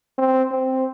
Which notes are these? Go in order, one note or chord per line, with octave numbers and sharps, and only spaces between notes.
C4
C4